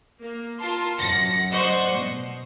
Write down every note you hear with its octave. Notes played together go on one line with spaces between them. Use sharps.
A#3
F4 A#4 A5 C6
F#2 F#5 A#6 C#7
C5 D5 D#5 F#5 C#6
B2